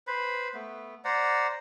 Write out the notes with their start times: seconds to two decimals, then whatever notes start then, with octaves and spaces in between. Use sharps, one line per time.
0.07 B4 C5 B5
0.54 A3 B3
1.04 C5 D5 F#5 A#5